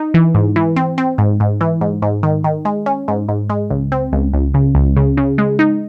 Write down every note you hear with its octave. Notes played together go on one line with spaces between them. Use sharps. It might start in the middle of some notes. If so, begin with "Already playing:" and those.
Already playing: D#4
E3
G#2
E3
C4
C4
G#2
G#2
E3
G#2
G#2
D#3
D#3
G#3
C#4
G#2
G#2
G#3
C#2
C4
C#2
C#2
C#3
C#2
C#3
C#3
G#3
D#4